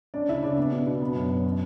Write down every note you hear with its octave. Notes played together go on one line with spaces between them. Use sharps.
C#4 D4 D5
C#3 E4 E5
C#3 D4 D5
B3 D4 D5
B2
B2
B3
F#2
F#2
C#4